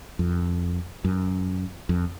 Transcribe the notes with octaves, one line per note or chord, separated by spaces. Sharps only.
F2
F#2
F2